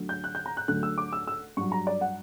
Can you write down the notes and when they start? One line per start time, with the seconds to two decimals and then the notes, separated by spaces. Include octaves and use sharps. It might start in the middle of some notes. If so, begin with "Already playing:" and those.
Already playing: D2 D3 F#3
0.09 G6
0.24 F#6
0.35 G6
0.46 A#5
0.57 F#6
0.68 D2 D3 F#3 F#6
0.83 E6
0.98 D6
1.13 E6
1.27 E6
1.57 G2 F#3 C#6
1.72 A#5
1.87 D5
2.01 F#5